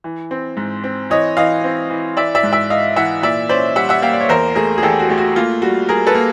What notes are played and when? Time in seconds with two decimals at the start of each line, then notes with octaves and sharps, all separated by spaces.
0.04 E3
0.31 C4
0.57 G#2
0.84 C4
1.10 E3 C#5 D#5
1.37 E3 D#5 F5
1.64 C4
1.90 E3
2.17 E3 D5 E5
2.35 D5 E5
2.43 G#2
2.52 D5 E5
2.70 G#2 D#5 F5
2.96 E3 E5 F#5
3.22 A#2 D5 E5
3.49 C#4 C5 D5
3.76 G3 E5 F#5
3.89 E5 F#5
4.02 A#3 F5 G5
4.13 D5
4.21 C#5
4.29 E2 A#4 C5
4.55 A3 G#4 A#4
4.78 G#4
4.83 E2 G4 A4
5.00 F#4
5.09 A3 G4
5.18 F#4
5.36 A#3 F4
5.62 G3 F#4
5.89 G3 G#4 A#4
6.07 A4 B4
6.15 A#3